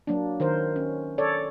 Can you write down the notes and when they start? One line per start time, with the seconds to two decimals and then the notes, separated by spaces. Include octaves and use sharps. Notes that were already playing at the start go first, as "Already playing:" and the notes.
0.07 F#3 A#3 D4
0.40 D#3 A#4 C5
0.76 C#4
1.18 A4 C#5 D5